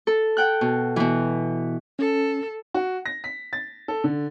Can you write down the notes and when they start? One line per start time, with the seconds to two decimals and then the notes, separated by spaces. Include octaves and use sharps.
0.07 A4
0.37 F#5 G5 F#6
0.61 B2
0.96 B2 E3
1.99 C#4 A4
2.74 F#4
3.06 A#6
3.24 B6
3.53 A6
3.88 A4
4.04 D3